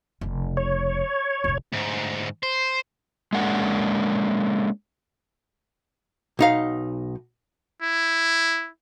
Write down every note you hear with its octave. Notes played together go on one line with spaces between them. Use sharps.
F1 C#3
C#5
F1 A2
D2 G#2
C5
G#3 A#3 C#4 D4 F#5
B1 D#4 F5
E4